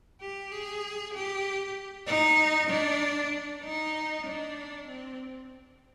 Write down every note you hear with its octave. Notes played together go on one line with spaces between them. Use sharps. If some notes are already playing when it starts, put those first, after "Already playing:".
G4
G#4
G4
D#4
D4
D#4
D4
C4